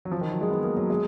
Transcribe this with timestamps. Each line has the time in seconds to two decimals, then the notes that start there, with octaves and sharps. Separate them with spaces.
0.05 F#3
0.11 F3
0.21 D#3
0.31 F#3
0.41 G#3
0.51 B3
0.64 A#3
0.77 F#3
0.90 G#3